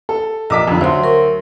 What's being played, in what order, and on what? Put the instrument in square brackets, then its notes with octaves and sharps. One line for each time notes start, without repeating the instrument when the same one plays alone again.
[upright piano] A4
[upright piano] A#1 D6 B6 [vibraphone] D#5 A#5
[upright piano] F2 D3
[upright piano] D2 F#3 [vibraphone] C5 C6
[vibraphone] A#4 C#6